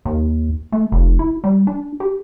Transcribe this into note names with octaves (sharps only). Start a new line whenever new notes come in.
D#2
A3
F1
E4
G3
D4
G4